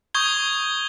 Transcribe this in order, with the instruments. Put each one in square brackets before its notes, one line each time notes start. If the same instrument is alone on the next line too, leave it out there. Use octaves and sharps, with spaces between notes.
[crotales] C#6 D#6 G6 G#6 G7